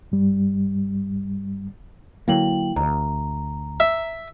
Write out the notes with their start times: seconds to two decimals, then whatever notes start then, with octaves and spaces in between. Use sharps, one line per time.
0.12 G2 G3
2.28 D3 F#3 A#3 E4 G5 F#7
2.76 D2 A#5
3.80 E5